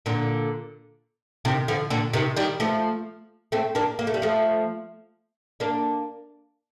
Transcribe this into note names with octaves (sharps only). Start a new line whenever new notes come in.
A#2 D3
C3 D#3
D3 F3
A#2 D3
C3 D#3
D#3 G3
F3 A3
A3 C4
A#3 D4
A#3
A3
G3
F3 A3
A#3 D4